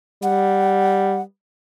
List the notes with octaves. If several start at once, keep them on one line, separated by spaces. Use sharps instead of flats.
G3 F#5